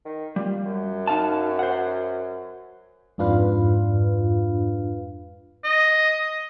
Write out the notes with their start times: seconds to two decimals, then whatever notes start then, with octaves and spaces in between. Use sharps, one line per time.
0.06 D#3
0.36 G3 F4
0.66 F#2
1.07 D#4 F5 A5
1.59 C5 F#5
3.18 F2 G#2 D4 F4 B4 F5
5.64 D#5